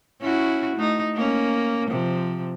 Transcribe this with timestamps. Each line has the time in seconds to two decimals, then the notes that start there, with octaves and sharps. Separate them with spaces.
0.21 C#4 E4 F#4
0.76 A3 D#4
1.14 A#3 C#4
1.90 C3 F3